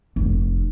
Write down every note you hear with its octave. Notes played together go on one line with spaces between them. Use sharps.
F1